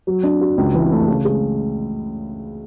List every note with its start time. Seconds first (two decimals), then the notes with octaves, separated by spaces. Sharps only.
0.07 F#3
0.23 D4
0.41 F#4
0.58 C#2
0.74 E3
0.91 A3
1.08 C#3
1.25 G#3